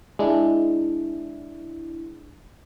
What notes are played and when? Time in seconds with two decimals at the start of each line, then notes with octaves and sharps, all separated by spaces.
0.19 G#3 D4 E4